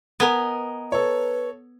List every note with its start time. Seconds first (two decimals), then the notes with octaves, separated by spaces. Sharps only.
0.20 B3 A#4 D#5 G#5
0.92 A4 B4 C#5